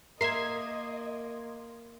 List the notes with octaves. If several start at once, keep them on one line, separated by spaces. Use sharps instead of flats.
A#3 A#4 D#5 E5 C6 G#6